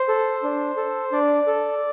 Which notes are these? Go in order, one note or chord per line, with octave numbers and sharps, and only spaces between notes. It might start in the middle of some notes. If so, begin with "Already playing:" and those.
Already playing: C5
A4
D4
A4
D4 D5
A4